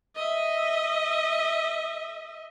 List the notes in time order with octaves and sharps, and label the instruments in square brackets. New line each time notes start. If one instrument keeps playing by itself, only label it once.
[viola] D#5 E5